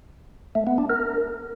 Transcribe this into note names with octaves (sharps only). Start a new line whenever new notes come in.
A3
B3
D4
A#4